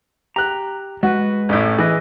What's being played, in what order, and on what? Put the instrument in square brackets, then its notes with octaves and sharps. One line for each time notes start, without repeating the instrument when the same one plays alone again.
[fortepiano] G4 F#6 [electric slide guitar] A#5
[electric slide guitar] G#3 B4 [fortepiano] F#4
[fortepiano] A1 A2
[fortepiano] E3 [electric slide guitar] G#4 D#5